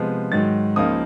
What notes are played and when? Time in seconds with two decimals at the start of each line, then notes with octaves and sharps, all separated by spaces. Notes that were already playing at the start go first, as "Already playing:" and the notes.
Already playing: C3 F3 G#3 B3
0.32 G#2 D#3 F#3 A6
0.76 C#2 C#3 F3 A#3 D#4 D#6